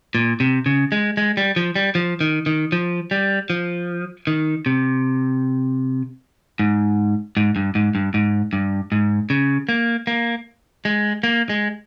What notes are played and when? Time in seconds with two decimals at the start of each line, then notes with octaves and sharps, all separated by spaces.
0.15 A#2
0.40 C3
0.66 C#3
0.92 G#3
1.17 G#3
1.37 G3
1.56 F3
1.76 G3
1.95 F3
2.21 D#3
2.46 D#3
2.72 F3
3.11 G3
3.50 F3
4.27 D#3
4.66 C3
6.59 G#2
7.37 G#2
7.56 G2
7.75 G#2
7.95 G2
8.14 G#2
8.53 G2
8.92 G#2
9.30 C#3
9.69 A#3
10.07 A#3
10.85 G#3
11.23 A#3
11.49 G#3